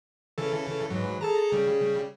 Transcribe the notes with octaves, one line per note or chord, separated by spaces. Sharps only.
C#3 E3 A4
G#2 E3 F#3
G#4 A4 A5 A#5
C#3 G3